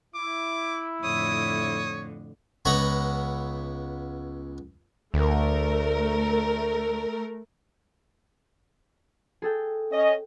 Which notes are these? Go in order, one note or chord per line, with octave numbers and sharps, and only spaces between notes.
E4 D6
F2 A2 D3 C#5 D#6
C#2 B3 C#5 A#5 B5
D2 A3 A#4
G#4 A4 G5
C#4 D#5